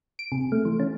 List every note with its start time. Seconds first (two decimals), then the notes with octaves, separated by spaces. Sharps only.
0.19 D7
0.32 C3
0.52 A3
0.65 E3
0.80 C#4